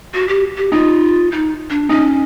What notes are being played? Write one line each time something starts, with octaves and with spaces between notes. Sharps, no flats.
F#4
G4
G4
D#4 F4
D#4
D4
C#4 D#4